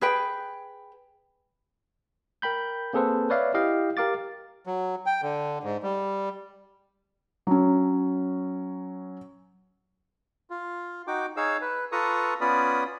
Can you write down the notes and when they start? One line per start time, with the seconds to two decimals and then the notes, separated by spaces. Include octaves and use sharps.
0.01 G#4 B4 G5
2.42 A#4 G5 B5 G6
2.93 A#3 C4 G#4 A4 B4 C5
3.30 B4 C#5 D5 E5 F5
3.54 E4 G4 D#5 F5 G5
3.97 G4 A#4 F5 D6 A6
4.67 F#3
5.06 G5
5.22 D3
5.63 G#2
5.83 G3
7.47 F#3 C#4
10.50 F4
11.07 D#4 F#4 G5 D6
11.37 D#4 G#4 C#5 F5 E6
11.61 B4
11.92 F4 A4 B4 A#5 C#6 D#6
12.41 B3 C#4 F4 D5 B5 D#6